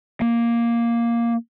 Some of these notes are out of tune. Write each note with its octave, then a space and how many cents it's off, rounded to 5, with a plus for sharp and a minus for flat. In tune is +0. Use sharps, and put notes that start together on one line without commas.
A#3 +5